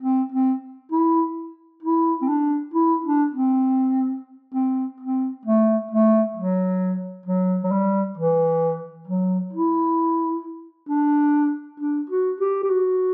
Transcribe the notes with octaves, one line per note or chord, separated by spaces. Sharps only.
C4
C4
E4
E4
C4
D4
E4
D4
C4
C4
C4
A3
A3
F#3
F#3
F#3
G3
E3
F#3
E4
D4
D4
F#4
G4
G4
F#4